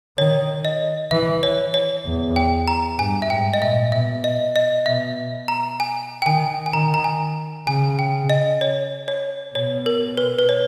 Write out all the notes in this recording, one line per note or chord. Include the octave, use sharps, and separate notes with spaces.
D#3 C#5
D#5
E3 E5
C#5
C#5
E2
G5
A#5
G2 G#5
E5
G#2 G5
D#5
A#2 E5
B2 E5
D#5
D#5
B2 E5
A#5
G#5
G5
D#3 G#5
G#5
D#3 A#5
A#5
G#5
C#3 G#5
G5
D#5
C#5
C#5
B2 C#5
A#4
B4
B4
C#5